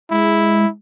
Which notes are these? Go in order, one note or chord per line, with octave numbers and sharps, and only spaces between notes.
G#3 E4